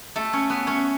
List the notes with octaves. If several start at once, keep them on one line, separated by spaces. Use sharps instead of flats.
A3 A4
C#4 C#5
B3 B4
C#4 C#5